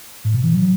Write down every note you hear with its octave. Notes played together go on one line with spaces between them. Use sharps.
A2
B2
E3
F#3